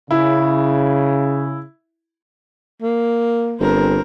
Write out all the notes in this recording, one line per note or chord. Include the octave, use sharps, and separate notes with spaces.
C#3 E4
A#3
G1 C4 A#4